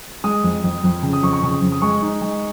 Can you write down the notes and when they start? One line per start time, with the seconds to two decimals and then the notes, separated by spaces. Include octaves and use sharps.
0.24 G#3 D#6
0.44 F2
0.64 F2
0.84 F2
1.03 C#3
1.13 D#6
1.23 F2 C#6
1.33 C#6
1.42 C#3 D#6
1.62 F2
1.72 D#6
1.82 G#3 C#6
2.02 D#4
2.22 G#3